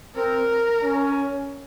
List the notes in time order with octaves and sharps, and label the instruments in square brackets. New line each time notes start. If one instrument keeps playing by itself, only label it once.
[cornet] C4 [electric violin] A#4
[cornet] C#4